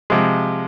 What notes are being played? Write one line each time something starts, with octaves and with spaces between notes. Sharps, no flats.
C3 F3 G#3